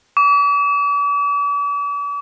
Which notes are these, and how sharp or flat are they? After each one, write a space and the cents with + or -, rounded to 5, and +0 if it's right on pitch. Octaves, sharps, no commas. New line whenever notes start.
D6 -45